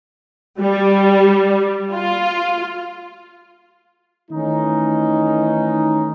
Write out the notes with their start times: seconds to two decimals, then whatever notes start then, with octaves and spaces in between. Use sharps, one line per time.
0.60 G3
1.94 F4
4.31 D#3 E3 A3 C#4 D#4